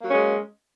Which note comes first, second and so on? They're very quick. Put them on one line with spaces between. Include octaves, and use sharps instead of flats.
A#3 F#3 C#4 G#3